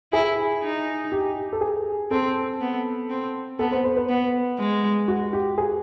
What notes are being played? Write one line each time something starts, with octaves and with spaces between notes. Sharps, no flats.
E4 G#4
D#4
G4
A4
G#4
C4 A4
B3
C4
B3 A4
C5
C5
B4
B3
G#3
F#4
G4
G#4